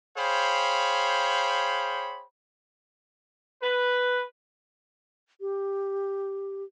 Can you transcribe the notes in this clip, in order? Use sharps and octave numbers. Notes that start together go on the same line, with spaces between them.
G#4 C5 C#5 F5 G5 B5
B4
G4